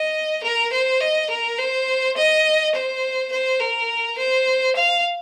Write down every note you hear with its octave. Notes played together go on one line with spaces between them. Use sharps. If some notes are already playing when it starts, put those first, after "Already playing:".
Already playing: D#5
A#4
C5
D#5
A#4
C5
D#5
C5
C5
A#4
C5
F5